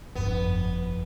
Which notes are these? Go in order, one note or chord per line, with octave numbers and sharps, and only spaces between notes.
G1 F2 B3